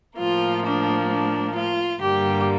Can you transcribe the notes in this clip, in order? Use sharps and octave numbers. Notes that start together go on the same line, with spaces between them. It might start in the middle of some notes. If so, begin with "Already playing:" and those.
A2 F3 A#3 F4
D4
D4
F4
G2 D3 G3 A#3 G4